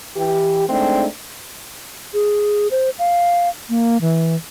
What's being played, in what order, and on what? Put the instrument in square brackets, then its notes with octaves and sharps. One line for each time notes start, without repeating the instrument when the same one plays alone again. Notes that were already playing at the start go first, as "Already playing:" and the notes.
[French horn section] E3 G4
G#3 A3 C4 D4 D#4
[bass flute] G#4
C5
F5
A#3
E3